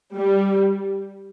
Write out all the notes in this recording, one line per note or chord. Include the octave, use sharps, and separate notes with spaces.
G3